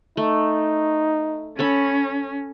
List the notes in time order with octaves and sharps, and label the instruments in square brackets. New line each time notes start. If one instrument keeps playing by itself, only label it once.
[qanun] A3 [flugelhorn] D#4
[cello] C#4 [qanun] A4 C#5 B5